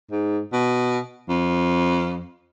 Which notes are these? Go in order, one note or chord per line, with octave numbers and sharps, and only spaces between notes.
G#2
B2
F2